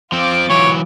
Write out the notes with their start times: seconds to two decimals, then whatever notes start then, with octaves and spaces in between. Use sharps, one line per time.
0.12 F3 C4 F4 D6
0.50 E3 F#3 C#5